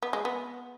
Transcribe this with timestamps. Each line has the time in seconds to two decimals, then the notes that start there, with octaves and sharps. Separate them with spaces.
0.02 B3
0.13 G#3
0.25 B3